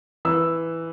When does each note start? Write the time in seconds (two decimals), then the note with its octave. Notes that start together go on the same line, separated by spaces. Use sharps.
0.25 E3 E6